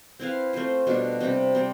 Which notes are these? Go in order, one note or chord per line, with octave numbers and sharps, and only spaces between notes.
C4 E4 B4 F5
A3 C4 F4 C5
B2 G3 D4 F4
C3 G3 C4 G4
G3 C4